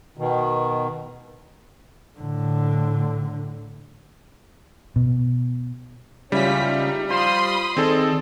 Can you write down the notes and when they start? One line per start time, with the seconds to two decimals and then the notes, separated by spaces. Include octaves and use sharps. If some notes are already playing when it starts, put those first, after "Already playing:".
0.18 B2 D#3
2.18 A2 D3
4.96 B2
6.32 C#3 G3 C#4 E4 F4 B6
6.66 D#4
7.10 F4 C5 B5 C6 D#6
7.77 D#3 C4 G#4 A4 D5